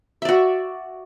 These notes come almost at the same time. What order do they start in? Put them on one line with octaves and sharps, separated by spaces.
E5 D5 F#4